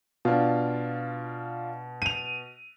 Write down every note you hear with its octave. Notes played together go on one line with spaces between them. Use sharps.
B2 D4 F4
D#7 F7